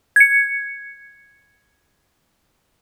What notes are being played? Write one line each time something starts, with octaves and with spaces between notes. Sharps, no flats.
G#6 C#7